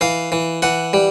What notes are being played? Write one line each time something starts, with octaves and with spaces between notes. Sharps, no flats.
E3 F5
E3
E3 F#5
G3